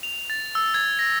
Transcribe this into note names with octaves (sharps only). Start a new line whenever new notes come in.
F7
A6
E6
G#6
A#6